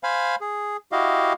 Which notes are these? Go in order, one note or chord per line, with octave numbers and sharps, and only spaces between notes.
C5 F5 G#5 B5
G#4
E4 F#4 G4 D#5 F5